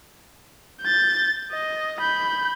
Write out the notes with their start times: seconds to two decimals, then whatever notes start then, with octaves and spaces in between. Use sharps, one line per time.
0.82 G6 A6
1.52 D#5
2.01 B5 G6